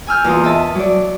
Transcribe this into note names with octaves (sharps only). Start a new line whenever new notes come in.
G#5 E6 F6 G6
E2 A#3 F4 D#6
D#5 E5 A5
F#3 D5